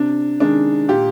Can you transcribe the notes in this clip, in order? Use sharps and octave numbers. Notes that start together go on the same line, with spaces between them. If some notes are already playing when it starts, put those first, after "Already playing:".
Already playing: C3 D4
D#3 G#3 D4
A#2 G4